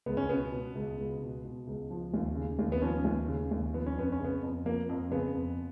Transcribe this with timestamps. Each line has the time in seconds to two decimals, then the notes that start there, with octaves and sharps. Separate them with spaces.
0.06 C#2 B3
0.17 C#4
0.29 B2 B3
0.52 B2
0.75 C#2
0.98 C#2
1.22 B2
1.45 B2
1.67 C#2
1.91 F3
2.14 D#2
2.36 C#3
2.59 D#2
2.72 B3
2.82 F3 C#4
3.04 D#2
3.28 C#3
3.51 D#2
3.74 F3 B3
3.86 C#4
3.97 F2 B3
4.12 C#4
4.19 C#3
4.24 B3
4.43 F2
4.65 F3 A#3
4.89 F2
5.11 C#3 B3
5.34 F2